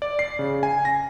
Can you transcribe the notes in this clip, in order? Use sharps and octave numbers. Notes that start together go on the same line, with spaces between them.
D5
C7
C#3
G#5
A#6